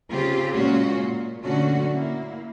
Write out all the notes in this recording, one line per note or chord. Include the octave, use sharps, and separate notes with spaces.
C#3 C4 F4 G4 G#4
A#2 G#3 A#3 C#4 F4 F#4
A#2
A#2 D3 F#3 A3 C#4 F#4
A#2 A#3 E4